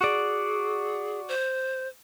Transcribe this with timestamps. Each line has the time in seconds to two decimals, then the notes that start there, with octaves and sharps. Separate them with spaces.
0.01 F#4 G#4 D5
1.28 C5